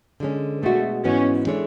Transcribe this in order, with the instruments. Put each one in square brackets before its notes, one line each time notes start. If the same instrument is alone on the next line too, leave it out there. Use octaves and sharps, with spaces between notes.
[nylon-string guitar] D3 G#3 C#4
[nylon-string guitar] B2 G#3 D4 F#4 [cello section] A3
[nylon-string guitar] G#2 E3 B3 F#4 [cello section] C#4
[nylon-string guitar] E3 G#3 D4 A4 C#5